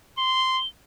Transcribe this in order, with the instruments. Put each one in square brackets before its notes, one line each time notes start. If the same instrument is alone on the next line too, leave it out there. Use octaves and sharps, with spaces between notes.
[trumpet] C6 [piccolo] G7